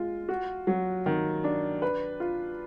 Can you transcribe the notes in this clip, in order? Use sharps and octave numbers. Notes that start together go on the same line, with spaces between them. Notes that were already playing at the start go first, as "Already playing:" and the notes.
Already playing: G#3 F4
F#4
F#3
D#3
D4
B4
F4